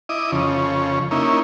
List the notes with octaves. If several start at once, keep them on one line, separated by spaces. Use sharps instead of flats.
E4 D#5 D6 D#6
F2 C#3
A#3 C#4 D#4 E4